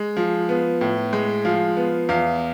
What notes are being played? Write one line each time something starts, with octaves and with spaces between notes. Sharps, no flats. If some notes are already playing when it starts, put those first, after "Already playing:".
Already playing: G#3
F3
B3
A2
G#3
F3 F5
B3
E2 F5